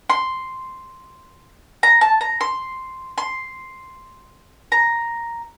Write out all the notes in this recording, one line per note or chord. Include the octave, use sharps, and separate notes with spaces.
C6
A#5
A5
A#5
C6
C6
A#5